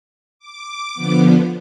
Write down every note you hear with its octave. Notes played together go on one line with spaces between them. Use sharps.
D6
D3 F3 B3